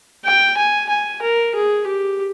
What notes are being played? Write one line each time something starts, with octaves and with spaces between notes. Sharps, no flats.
G5
G#5
G#5
A#4
G#4
G4